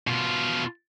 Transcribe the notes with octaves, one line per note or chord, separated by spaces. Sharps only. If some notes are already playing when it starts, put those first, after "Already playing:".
B2 F4